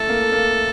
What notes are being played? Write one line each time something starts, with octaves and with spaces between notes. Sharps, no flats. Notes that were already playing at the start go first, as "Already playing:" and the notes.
Already playing: A3 E4 A4
A#3
A#3